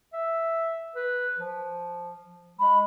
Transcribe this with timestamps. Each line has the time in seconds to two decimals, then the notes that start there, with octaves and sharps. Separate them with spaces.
0.13 E5
0.96 B4
1.38 F3
2.59 G#3 B5